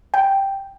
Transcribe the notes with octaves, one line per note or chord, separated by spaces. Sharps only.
G5